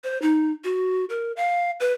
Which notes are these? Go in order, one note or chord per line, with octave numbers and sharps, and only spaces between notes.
C5
D#4
F#4
A#4
F5
B4